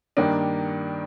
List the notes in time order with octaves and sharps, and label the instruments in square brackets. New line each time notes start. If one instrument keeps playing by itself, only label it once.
[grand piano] G2 D#3 A#3 D4